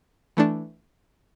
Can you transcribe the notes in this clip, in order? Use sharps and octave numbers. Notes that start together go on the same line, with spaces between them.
E3 A3 D4